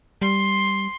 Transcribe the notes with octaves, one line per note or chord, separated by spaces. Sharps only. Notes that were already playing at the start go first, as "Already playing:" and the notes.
G3 C6